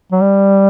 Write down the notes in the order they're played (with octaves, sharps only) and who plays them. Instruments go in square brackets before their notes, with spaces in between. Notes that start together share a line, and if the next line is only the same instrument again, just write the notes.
[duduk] F#3
G3